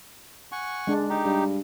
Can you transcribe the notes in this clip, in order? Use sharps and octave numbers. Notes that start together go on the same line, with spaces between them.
F#5 G#5 C#6
G#3 D4
D#4 G4
G2